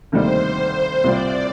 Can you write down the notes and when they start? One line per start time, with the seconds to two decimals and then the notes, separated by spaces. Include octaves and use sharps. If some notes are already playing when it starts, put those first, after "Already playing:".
0.12 D2 C3 D#3 G3 A#3 C5
1.04 C2 C3 G3 C4 F4 D5